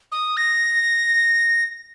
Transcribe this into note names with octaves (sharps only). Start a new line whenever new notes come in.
D#6
A#6